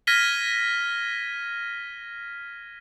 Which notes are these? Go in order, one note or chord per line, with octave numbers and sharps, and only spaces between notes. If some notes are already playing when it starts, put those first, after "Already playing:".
F6 G#6 A#6 B6 D#7 G7